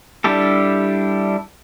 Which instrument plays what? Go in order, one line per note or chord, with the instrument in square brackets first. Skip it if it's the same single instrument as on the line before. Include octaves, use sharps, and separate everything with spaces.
[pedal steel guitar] G3 D4 E4 G4 A4